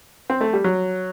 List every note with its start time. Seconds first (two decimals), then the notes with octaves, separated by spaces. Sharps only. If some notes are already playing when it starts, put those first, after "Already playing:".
0.30 C4
0.41 A3
0.53 G3
0.64 F#3